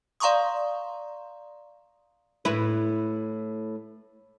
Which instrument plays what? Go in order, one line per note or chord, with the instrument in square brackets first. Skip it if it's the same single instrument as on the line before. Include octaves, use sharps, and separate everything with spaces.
[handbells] D5 F5 A#5 C6 C#6 D#6
[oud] A2 E4 B4